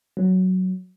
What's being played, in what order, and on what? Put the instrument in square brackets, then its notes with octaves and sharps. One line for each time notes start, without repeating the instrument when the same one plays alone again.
[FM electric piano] F#3